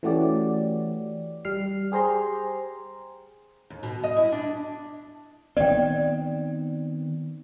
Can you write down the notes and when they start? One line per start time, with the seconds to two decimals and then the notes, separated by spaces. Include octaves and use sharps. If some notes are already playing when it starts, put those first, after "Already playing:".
0.03 E3 A3 C#4 F#4 G4 D5
1.45 G3 F6 C7
1.92 G4 G#4 C5 A#5 C6
3.70 D#2
3.83 B2
4.04 D#5
4.16 E4
4.32 D4
5.57 D#3 B3 C4 D5 G5